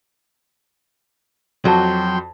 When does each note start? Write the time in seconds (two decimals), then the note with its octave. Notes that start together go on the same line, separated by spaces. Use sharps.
1.65 F2 F#3 F#4 D5 G5 A5 C6